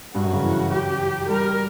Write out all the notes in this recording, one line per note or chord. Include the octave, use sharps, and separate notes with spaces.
G2 F#4
F#2
C#3
E3
F#3 G4
G3 A#4